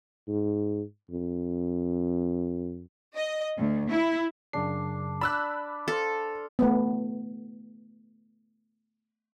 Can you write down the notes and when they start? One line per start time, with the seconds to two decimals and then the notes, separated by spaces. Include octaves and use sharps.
0.28 G#2
1.11 F2
3.16 D#5
3.57 D2
3.90 E4
4.53 F#2 C#3 D4 C7
5.21 D4 D5 A5 B5 E6 F#6
5.88 A4 C5 F5
6.59 A3 B3